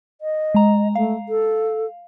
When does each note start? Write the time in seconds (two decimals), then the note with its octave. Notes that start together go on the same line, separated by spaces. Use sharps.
0.21 D#5
0.55 G#3 A#5
0.95 A3 F5
1.29 A4